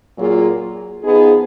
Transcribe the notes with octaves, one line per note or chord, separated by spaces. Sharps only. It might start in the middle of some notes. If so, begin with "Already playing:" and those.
A#2 F#3 A#3 F4 G#4
F3 B3 D#4 G#4